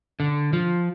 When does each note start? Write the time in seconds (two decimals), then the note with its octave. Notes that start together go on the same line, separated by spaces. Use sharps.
0.20 D3
0.53 F3